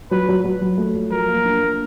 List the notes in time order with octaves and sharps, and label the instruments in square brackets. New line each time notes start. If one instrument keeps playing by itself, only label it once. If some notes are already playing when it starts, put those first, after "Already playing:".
[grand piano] F#3 [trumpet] B4
[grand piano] F#3
F#3
F#3
A3
F#3
[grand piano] F3 [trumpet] A#4
[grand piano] A#3
D4
A#3